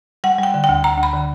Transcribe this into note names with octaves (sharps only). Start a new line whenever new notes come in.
G3 F#5
G3
G5
D3
G5
D2
D2 A#5
D2 B5
D3